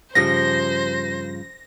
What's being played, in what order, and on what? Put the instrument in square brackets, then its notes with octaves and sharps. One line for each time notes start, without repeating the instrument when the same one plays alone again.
[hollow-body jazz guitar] G2 C#3 F3 [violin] C5 [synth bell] A#6